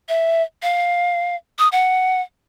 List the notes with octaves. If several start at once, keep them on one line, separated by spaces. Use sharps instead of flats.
E5
F5
D#6
F#5